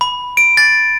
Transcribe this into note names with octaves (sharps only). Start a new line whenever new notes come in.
B5
D7
A6